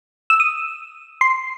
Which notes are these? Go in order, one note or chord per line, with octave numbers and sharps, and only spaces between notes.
E6
D#6
C6